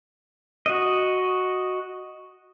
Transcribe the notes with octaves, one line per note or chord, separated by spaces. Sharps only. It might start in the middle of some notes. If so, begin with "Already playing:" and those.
F#4 D#5